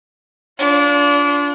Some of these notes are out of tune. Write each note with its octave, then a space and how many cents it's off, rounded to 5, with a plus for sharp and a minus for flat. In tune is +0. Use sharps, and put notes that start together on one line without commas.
D4 -30 F4 +0